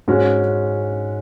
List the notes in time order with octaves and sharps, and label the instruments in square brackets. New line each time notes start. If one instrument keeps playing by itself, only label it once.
[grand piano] G#2 G#3 C#4 F#4